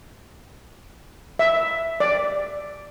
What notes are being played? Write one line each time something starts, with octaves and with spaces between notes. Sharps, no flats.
E5
D5